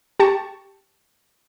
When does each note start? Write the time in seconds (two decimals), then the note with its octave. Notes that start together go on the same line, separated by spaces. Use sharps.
0.20 G4 A5 C#6